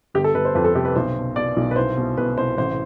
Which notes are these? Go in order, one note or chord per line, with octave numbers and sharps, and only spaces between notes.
G1 G4
A4
G1 B4
C5
F2 B4
A4
C3 G4
B4
B1 C5
B2
B2 D5
B1
B4
C2 C5
B2
B2 B4
C2 C5
A1 C5